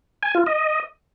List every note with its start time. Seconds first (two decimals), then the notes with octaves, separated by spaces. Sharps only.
0.23 G#5
0.35 F4
0.46 D#5